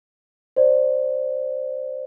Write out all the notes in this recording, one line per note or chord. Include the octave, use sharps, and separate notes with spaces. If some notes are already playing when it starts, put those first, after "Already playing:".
C5 D5